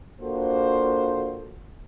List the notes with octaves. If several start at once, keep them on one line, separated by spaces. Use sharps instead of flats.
A#3 D4 F4 F#4 A4 C5